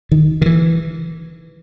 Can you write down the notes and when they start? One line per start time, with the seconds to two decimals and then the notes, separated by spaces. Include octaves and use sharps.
0.12 D#3
0.42 D#3
0.46 E3